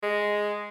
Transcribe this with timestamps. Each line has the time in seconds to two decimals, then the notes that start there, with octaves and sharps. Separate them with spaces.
0.03 G#3